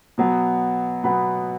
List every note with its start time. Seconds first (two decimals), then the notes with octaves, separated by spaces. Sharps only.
0.18 B2 F#3 B3
1.04 B2 F#3 B3 B5